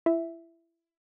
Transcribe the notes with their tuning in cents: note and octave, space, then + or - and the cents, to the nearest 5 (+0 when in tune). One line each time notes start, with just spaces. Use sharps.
E4 +25 E5 +0